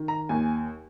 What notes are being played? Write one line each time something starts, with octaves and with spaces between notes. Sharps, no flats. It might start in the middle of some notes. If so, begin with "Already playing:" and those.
Already playing: D#3
A#5
D#2 G#5